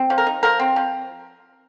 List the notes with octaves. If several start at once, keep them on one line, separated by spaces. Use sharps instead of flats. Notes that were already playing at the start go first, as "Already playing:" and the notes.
Already playing: C4
F3
A#4
D#4
F3 A#4
C4
F3